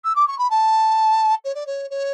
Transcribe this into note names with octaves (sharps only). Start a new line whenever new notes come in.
E6
D6
C#6
B5
A5
C#5
D5
C#5
C#5